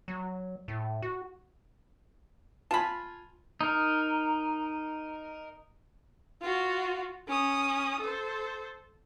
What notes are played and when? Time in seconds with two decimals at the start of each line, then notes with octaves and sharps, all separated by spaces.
0.08 F#3
0.68 A2
1.02 F#4
2.71 F4 G#5 A5 B5
3.61 D#4 A#4
6.42 F4 F#4
7.28 C#4 D#6
8.01 A4 C5